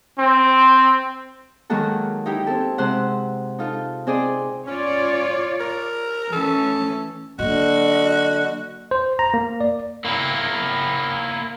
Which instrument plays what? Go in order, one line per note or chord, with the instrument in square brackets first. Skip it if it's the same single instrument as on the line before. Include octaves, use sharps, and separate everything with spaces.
[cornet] C4
[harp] D#3 F#3 G#3 A#3 F#4 A4
D#4 E4 G4
C4 E4 A4
C3 G#3 C5 F#5
D#4 F4 A4
C4 G#4 D5 D#5
[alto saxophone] C#4 [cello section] F4 C#5 D5
[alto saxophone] A#4
[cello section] E3 A3 C#4 [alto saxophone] A4
[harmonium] D3 [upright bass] F#3 A#3 [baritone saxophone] F#4 [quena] D#5
[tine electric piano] C5
A#5
A#3
D5
[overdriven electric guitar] A#3 E4